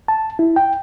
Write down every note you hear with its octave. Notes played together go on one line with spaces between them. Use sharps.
A5
E4
G5